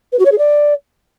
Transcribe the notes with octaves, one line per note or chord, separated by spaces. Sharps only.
B4
F#4
C#5
G#4
D5